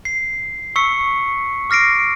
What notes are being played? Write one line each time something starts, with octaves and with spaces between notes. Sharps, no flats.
C7
C#6 E6 B6 C#7
D6 F6 A#6 C7 D7